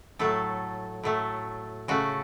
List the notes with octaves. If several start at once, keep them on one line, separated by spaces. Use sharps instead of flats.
A2 F#3 A3 A4
A2 F#3 A3
C#3 A3 F#4